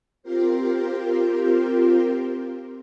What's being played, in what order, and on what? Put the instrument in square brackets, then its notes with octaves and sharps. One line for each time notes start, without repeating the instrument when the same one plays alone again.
[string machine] C4 F4 G4 A#4 C5